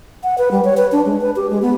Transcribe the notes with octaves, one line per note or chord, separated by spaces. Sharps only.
F#5
B4
G3
C#5
B4
D4
G#3
B4
G4
G#3
B3